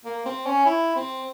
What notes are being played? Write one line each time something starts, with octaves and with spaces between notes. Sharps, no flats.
A#3
C4
C#4
E4
C4